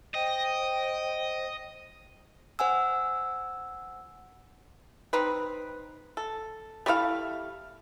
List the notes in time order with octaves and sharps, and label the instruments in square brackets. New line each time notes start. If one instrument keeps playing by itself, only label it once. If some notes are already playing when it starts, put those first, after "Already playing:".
[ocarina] C5 [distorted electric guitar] D#5 [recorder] G5
[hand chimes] C5 F#5 G#5 E6
[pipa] C4 D#4 B4
A4
G3 A3 E4 F5